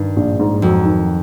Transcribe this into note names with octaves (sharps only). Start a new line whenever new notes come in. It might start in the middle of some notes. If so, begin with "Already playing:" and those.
Already playing: G2 D#3
A#1
G#2
F2 F#3
D#3